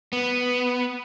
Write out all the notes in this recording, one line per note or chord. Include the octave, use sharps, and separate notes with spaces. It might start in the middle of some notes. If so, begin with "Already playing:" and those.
B3